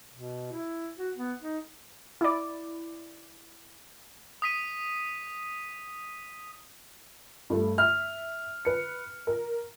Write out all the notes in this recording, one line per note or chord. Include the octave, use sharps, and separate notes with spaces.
B2
E4
F#4
B3
D#4
E4 D5
D#6 B6 D#7
G2 A3
E5 F6
B4 C#7
A#4